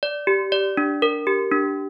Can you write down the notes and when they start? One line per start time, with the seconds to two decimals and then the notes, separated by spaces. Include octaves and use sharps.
0.03 D5
0.27 G4
0.52 D5
0.77 D4
1.02 A#4
1.27 G4
1.51 D4